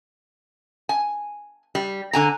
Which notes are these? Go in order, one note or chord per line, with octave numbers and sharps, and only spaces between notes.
G#5
G3
D3 G#5 A#5